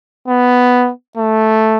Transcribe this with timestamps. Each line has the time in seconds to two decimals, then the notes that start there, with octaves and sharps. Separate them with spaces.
0.28 B3
1.17 A3